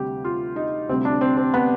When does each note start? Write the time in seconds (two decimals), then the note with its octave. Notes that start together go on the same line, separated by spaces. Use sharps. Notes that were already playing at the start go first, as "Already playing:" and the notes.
Already playing: D2 C3 G3 G4
0.25 F4
0.56 D#4
0.89 D2 C3 G3 C4
1.05 D4
1.21 C4
1.37 C4
1.54 B3